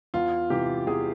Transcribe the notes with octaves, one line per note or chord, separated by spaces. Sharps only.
E2 F4
C3 E3 G4
E2 G#4